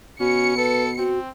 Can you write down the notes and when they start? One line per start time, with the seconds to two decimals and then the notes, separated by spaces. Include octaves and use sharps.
0.20 B2 C#4 F#4 C#7
0.57 A4 B4
0.98 C4 F#4